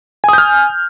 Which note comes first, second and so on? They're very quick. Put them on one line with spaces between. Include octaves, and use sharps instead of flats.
G#5 D#6 G6 F6